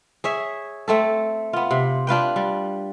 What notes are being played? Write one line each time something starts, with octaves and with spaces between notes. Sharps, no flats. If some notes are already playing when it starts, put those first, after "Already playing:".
G#4 C#5 E5
A3 C4 A4
B3 F4
C3
D4 F4 B4 G5
G3